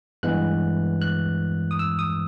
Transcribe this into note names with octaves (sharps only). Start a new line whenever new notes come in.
G2 E3 G#3 B3 F#6
F#6
D#6
E6
D#6